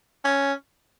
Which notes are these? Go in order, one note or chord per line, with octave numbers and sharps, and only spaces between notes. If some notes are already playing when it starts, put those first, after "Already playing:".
C#4